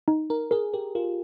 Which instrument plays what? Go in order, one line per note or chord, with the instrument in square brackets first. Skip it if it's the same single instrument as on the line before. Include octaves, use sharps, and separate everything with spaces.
[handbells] D#4
[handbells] D#4 [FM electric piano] A#4
[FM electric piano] G#4 [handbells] A#4
[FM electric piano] G4 [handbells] A#4
[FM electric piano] F4 [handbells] A#4